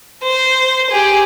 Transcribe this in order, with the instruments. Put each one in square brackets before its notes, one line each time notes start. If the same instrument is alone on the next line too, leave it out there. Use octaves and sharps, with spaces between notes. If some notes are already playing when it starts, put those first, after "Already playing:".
[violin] C5
G4 G#4